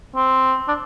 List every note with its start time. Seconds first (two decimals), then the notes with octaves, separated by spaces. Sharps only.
0.16 C4
0.68 D4